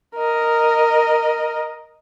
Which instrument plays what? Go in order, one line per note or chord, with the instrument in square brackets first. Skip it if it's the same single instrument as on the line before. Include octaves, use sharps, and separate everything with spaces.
[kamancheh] A#4 D#5